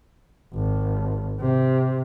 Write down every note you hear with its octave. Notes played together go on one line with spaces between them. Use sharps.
G#1
C3